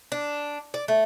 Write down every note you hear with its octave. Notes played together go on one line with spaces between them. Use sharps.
D4
D5
A3